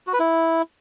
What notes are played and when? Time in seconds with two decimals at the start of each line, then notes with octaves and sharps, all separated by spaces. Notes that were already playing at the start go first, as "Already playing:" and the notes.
0.07 F#4
0.13 B4
0.19 E4